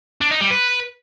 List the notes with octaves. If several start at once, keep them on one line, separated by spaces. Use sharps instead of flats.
D4
D#4
G3
B4